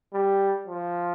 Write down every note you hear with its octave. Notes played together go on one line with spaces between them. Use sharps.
G3
F3